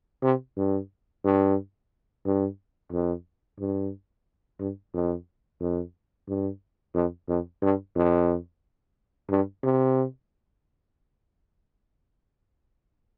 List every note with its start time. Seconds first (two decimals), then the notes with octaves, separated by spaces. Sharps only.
0.23 C3
0.57 G2
1.24 G2
2.25 G2
2.92 F2
3.59 G2
4.59 G2
4.94 F2
5.60 F2
6.28 G2
6.95 F2
7.28 F2
7.62 G2
7.95 F2
9.30 G2
9.63 C3